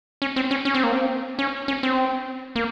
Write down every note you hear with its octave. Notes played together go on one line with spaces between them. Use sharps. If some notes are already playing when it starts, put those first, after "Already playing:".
C#4
C4
C#4
C#4
C4
A#3
C4
C#4
C#4
C4
A#3